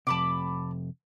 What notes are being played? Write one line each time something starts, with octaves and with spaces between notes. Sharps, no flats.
F2 C3 A5 B5 D6